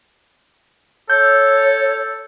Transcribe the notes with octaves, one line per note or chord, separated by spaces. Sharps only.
A4 C#5 G6